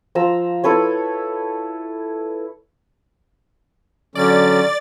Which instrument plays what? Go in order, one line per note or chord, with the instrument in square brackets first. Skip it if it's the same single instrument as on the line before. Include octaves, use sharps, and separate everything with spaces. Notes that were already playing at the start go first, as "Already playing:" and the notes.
[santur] F3 A#5 E6
E4 A4 B4 C#5
[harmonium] D3 F#3 C#4 [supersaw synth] D5 A6